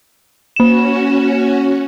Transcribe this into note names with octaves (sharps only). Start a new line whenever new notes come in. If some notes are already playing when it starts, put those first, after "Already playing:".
A#3 C#4 F#4 E7